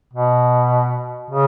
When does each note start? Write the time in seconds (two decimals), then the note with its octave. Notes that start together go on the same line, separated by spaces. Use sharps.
0.14 B2
1.31 C#3